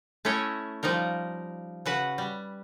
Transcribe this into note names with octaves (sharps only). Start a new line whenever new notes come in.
A3 C#4 E4 C#5 D#5
F3 G3 D#4 A#4
C#3 F#4 B4 F#5
G3